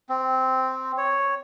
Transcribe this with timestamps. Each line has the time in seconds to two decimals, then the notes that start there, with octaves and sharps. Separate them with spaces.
0.09 C4
0.98 C#5